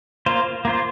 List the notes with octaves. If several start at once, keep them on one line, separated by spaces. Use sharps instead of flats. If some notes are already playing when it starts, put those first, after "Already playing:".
A#3 F4 C5
A#3 F4 C5